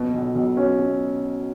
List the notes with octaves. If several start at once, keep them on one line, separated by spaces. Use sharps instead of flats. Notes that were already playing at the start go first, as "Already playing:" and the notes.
Already playing: F#1 B2
B1
B1
F#3 C#4
B2